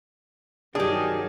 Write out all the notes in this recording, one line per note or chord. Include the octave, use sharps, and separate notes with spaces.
G2 D#3 F#3 D4 G4 G#4